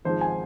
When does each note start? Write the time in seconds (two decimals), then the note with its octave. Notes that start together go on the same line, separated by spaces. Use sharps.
0.05 G#1 G#2 F3 G#3 C5
0.21 G#5